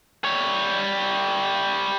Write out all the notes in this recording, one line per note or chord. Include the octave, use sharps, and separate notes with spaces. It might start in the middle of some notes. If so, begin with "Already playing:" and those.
G3 C#5